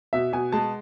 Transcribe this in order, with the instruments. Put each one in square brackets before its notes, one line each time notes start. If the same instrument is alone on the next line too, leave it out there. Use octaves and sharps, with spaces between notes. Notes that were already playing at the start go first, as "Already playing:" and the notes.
[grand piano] B2 E5
B2 G#5
G#3 A5